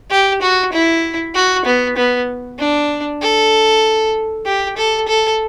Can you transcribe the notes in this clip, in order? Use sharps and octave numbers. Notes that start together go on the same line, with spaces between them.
G4
F#4
E4
F#4
B3
B3
D4
A4
G4
A4
A4